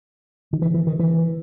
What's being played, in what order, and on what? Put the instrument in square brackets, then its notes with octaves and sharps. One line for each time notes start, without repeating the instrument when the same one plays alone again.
[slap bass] D#3
E3
E3
D#3
E3